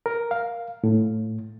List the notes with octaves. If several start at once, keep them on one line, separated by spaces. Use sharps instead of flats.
A#4
F5
A2